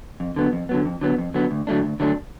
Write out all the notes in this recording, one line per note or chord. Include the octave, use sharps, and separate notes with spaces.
F2
D3 F#3 B3
F2
D3 F#3 B3
F2
D3 F#3 B3
F2
D3 F#3 B3
D2
D3 F#3 A3 D4
D2
D3 F#3 A3 D4